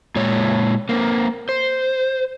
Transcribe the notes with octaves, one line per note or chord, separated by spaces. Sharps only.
A#2 G#3 C#5
A#3 C4
C5